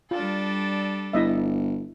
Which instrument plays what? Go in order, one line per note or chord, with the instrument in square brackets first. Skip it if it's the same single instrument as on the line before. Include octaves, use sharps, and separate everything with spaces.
[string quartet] G3 D4 A4 [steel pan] F4
[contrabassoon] G1 [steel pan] E4 D#5 E5